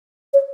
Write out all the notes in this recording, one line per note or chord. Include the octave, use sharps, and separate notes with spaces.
C#5